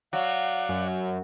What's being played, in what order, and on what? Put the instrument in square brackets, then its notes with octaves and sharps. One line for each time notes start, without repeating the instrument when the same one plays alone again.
[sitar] F#3 [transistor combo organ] D5 F#5 [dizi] F5
[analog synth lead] F#2